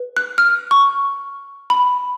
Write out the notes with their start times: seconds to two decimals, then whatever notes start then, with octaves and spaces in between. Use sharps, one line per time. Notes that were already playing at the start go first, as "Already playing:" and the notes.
Already playing: B4
0.17 F#6
0.38 F6
0.71 C#6
1.70 B5